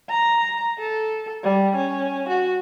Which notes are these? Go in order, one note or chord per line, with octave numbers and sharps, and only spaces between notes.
A#5
A4
G3
C#4
F#4